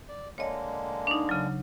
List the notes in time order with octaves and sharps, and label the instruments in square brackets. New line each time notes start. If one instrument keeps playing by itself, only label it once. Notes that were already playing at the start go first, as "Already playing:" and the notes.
[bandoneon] D5
[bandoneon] D3 G#3 A#3 [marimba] C#5 D#5
[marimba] D4 D#4
C#3 F#3